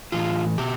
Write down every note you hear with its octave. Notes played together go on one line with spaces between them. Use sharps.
A2 E3 F4
B2 G4